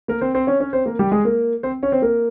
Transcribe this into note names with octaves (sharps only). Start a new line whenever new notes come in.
A#3 A#4
C4 C5
C4 C5
C#4 C#5
C#4 C#5
C4 C5
A#3 A#4
G3 G4
G#3 G#4
A#3 A#4
C4 C5
C#4 C#5
C4 C5
A#3 A#4